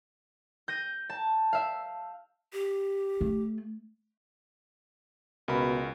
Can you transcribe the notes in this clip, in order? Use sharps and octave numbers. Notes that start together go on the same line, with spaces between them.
G6 A#6 D#7
A5
E5 F5
G4
A3
C#2 B2 A#4 B5